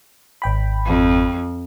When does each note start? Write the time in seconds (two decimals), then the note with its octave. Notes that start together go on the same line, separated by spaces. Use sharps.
0.42 G#1 G5 B5
0.85 F2